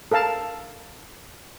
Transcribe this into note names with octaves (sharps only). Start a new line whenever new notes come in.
A4 A#4 F5 A5